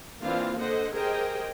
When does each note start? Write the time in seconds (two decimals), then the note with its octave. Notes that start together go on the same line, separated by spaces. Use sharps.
0.23 E3 A#3 C4 D4 F4 F5
0.59 D3 A4 C5 D#5 F#5
0.92 G4 G#4 A#4 C5 D#5 G5